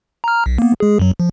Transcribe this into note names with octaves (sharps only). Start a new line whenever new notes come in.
A#5 F6
B1
A#3 B3
G#3 G#4
F#2 F#3
F3